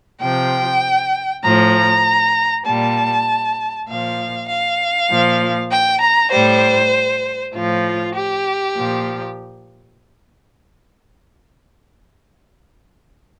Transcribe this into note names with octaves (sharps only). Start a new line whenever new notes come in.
C3 F3 G5
A2 F3 A#5
A#2 G3 A5
A#2 F3 F5
F5
A#2 F3
G5
A#5
A2 G3 C5
A2 F3 F4
G4
A#2 F3